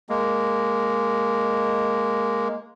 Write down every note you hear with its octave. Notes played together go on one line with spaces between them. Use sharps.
G#3 A#3